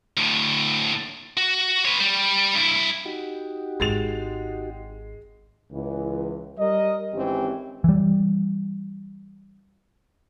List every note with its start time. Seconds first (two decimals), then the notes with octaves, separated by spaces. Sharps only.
0.17 D2 A2
1.37 F#4
1.85 B4 C#5
2.00 G3
2.55 G2 E4
3.05 D#4 F#4 G4
3.80 G#1 G#3 A6 F7
5.71 C#2 E3
6.58 G3 A#4 D#5
7.14 G#1 E3 C4 C#4 G4
7.84 E3 G3